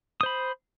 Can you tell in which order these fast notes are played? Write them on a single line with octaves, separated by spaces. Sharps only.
D#6 C5 B5